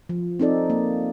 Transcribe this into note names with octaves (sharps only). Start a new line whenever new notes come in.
F3
C4 D#4 A4 D5
A#3